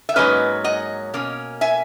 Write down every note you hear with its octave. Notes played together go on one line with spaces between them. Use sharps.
E5
G#2 F#3 A#3 C#4 B4 D#5
D#5 F#5
B2 A#3 C#4
E5 G#5